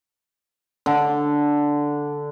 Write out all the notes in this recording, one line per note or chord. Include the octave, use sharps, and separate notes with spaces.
D3